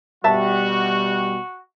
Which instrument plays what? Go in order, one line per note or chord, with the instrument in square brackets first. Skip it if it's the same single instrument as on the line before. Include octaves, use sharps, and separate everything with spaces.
[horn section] B2 G3 [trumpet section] F#4 [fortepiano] E5 A5